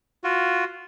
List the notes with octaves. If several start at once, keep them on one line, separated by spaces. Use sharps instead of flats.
F4 F#4